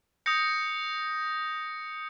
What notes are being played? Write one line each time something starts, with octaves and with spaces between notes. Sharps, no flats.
D#6 G6 A#6 C#7